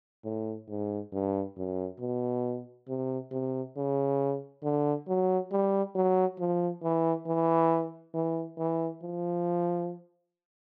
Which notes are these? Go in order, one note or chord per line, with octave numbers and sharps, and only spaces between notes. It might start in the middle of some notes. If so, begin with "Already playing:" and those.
A2
G#2
G2
F#2
B2
C3
C3
C#3
D3
F#3
G3
F#3
F3
E3
E3
E3
E3
F3